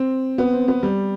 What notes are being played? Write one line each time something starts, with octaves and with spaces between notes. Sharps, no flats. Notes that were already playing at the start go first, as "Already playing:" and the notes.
Already playing: C4
B3
C4
B3
G3